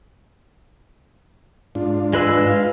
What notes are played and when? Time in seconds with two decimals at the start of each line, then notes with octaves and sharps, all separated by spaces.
1.75 G#2 D4 F4
2.13 G#3 B4 E6
2.47 F5